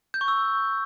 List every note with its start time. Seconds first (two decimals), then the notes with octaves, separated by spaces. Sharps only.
0.14 G6
0.21 C#6
0.28 E6